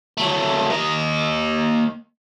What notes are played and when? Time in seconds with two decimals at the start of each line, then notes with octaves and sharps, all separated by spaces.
0.17 F#3 A3
0.70 A#3 D#5